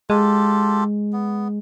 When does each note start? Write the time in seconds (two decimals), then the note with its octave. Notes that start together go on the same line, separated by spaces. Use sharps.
0.10 G#3 F4 G4 A4
1.13 B3